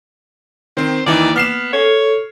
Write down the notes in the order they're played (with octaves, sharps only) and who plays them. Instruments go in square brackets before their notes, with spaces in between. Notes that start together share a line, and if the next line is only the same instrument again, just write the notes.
[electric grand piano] D#3 C4 [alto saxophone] C5
[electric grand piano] D#2 E3 D#4 [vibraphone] A#3 [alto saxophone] D5
[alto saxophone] B3 [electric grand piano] F6 C7 E7
[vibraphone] A4 [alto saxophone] C#5